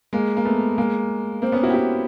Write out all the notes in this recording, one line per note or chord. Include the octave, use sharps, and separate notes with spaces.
G#3 A#3
A#3
A3 B3
G#3 A#3
A#3 C4
B3 C#4
E4 F#4
G4
E4 F#4